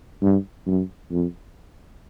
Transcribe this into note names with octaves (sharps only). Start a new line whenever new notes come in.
G2
F#2
F2